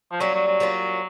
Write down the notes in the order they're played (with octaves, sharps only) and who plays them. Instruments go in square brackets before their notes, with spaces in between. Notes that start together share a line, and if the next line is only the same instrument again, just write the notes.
[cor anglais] F3
[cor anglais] F#3 [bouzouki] G3 A#3 C#4 F4
[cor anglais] F#3
F#3
[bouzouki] G3 A#3 C#4 F4